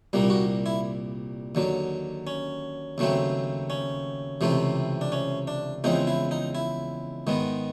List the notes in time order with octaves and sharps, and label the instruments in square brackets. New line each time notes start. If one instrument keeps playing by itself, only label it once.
[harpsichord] C2 A#2 G3 A#3
F#4
E4
D#2 D3 F#3
C#4
D#2 C#3 F#3 A3 C4
C#4
C#2 C3 E3 A3 C4
D4
C#4
D4
E2 C#3 F3 G#3 C4 D#4
E4
D#4
E4
G#2 D#3 G#3 B3